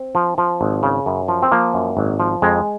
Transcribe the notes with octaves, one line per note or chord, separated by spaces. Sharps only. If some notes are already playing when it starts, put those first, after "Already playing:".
Already playing: C4
F3
F3
G#1
C#3
F#2
F3
C4
F3 A#3
F#2
G#1
F3
F2 G#3